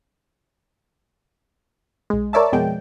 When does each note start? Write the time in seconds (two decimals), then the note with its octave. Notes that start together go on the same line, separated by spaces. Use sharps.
2.10 B1 G#3
2.33 A#4 C#5 D5 E5 A5
2.52 F2 B2 G#3 G5